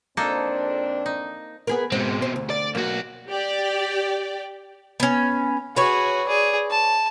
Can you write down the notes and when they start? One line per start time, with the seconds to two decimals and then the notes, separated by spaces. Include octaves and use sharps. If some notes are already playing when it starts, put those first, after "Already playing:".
0.17 F2 A#3 C4 D4 D#4 A4
1.06 D#4
1.67 B3 G#4 A#4
1.92 G#2 B2 G#3 C4
2.22 C5
2.36 D2
2.50 D5
2.75 B1 A#3 F#4
3.30 G4 D5 G5
5.00 B3 C#4
5.76 F#4 G#4 B4 C#5
6.27 G#4 D5
6.71 A5